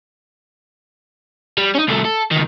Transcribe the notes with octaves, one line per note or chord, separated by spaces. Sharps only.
G3
C#4 D#4
C2 A3
A4
C#2 D#3